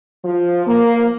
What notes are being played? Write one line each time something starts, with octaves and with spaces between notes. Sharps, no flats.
F3
A#3